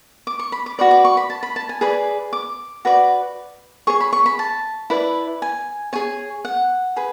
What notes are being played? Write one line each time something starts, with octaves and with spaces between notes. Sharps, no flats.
D6
C#6
B5
D6
F#4 B4 D5 C#6
D6
C#6
B5
A5
B5
A5
G#5
G#4 B4 D5 B5
D6
F#4 B4 D5
G#4 C#5 C#6
B5
C#6
B5
A5
E4 B4 D5
G#5
G#4 C#5 G#5
F#5
G#4 B4